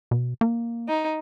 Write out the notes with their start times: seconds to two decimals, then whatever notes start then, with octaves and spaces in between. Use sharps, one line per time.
0.11 B2
0.41 A#3
0.88 D#4